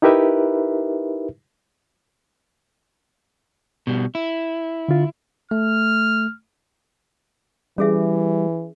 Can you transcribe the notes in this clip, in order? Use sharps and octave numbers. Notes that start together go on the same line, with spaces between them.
D#4 E4 G4 A#4 B4 E5
B2 G3
E4
D3 F4
A3 F6
E3 G3 C#4 G#4 E5